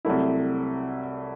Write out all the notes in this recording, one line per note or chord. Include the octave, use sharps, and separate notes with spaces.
C2 C3 F#3 A3 E4